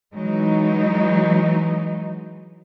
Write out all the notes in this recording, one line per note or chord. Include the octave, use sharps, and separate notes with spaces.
E3 F#3 G#3 D#4